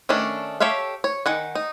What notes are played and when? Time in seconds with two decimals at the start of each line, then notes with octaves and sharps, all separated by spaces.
0.09 D#3 A3 C#4 D4
0.60 G4 A4 C#5 E5 F5
1.04 C#5
1.26 D#3 F#5 G#5
1.55 D#4